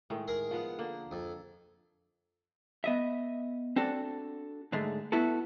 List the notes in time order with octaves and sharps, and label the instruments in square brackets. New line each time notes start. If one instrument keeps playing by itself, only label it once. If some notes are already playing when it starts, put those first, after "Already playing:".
[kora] A2 D#3 G#3
[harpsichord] G#4 A#4
[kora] F3 B3 F#5
D3 A#3
[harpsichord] F2
[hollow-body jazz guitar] B3 D#5 E5
C4 D4 F#4 A4
G#2 D3 G#3 A3
B3 E4 F#4 A4